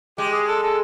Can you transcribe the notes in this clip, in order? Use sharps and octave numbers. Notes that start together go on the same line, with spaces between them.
G#3 G4
G#4
A4
A4